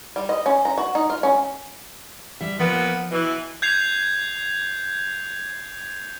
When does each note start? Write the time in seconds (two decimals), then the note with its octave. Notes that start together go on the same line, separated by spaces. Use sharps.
0.16 G3
0.29 D#5
0.46 C#4
0.65 A#5
0.78 F#4
0.95 D#4
1.10 F4
1.23 C#4
2.41 G3 E5
2.59 A#2 F3 B3
3.11 B2 E3
3.62 G6 G#6 C7 F7